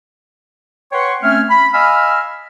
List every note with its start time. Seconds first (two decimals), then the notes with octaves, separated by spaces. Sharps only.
0.92 B4 C#5 F#5 G5 C6 C#6
1.23 A3 C4 C#4 E5 G#5 F6
1.50 B5
1.74 D#5 F5 G#5 B5 E6 F6